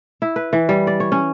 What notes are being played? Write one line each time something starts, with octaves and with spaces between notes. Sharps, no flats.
E4
B4
E3
G3
D5
C#5
C#4